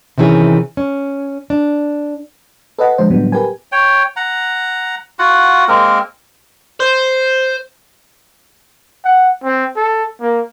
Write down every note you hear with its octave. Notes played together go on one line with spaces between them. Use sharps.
C3 D#3 E3 C#4 G#4
C#4
D4
A4 B4 D#5 F#5
D3 F3 G#3 C5
A2 D3 F#3 G3 B3
G4 A#4 B4 G#5
C#5 G5
F#5 A#5
F4 F#4 F#5
G#3 A#3 C4 A#4
C5
F#5
C4
A4
A#3